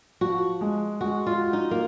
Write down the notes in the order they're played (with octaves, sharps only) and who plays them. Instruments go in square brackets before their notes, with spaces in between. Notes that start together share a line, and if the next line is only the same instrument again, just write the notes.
[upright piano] F3 [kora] F#4
[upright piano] G#3
[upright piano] G#3 [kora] F#4
[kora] F4
[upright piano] F#4
[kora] D#4
A#3